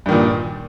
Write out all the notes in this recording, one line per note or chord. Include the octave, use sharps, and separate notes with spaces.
G2 A#2 D#3